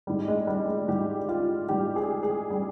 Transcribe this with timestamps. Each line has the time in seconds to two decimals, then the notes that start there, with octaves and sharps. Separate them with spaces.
0.07 G#2 G3
0.28 G#3
0.47 G3
0.68 G#3
0.88 G#2 G3 G4
1.29 F4
1.69 G#2 G3 G4
1.96 G#4
2.23 G#4
2.50 G3